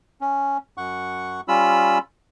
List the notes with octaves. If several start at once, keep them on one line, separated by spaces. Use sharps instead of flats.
C#4
F#2 F#5 C#6
G3 C#4 F4 B5 E6